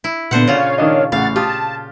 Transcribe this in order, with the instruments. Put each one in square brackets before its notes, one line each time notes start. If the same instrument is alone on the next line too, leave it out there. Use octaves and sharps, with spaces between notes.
[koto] E4
[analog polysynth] A#2 B3 [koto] D3 C5 F#5
[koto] A#2 C#3 F4 [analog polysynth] C#5 F5
[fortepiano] D#3 D4 D#5
[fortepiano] A1 C#3 [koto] F5 [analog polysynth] F#5 A6
[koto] F4 [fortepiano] G4 D#6 [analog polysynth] A5